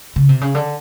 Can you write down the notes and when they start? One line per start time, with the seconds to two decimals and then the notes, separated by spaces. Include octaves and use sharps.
0.16 C#3
0.29 C3
0.41 C#3
0.54 D3